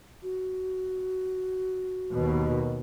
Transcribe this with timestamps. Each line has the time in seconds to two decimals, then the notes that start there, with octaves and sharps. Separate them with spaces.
0.23 F#4
2.14 D#2 B2